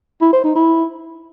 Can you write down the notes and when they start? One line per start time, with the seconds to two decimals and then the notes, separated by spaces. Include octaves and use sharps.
0.21 E4
0.33 C5
0.44 D#4
0.56 E4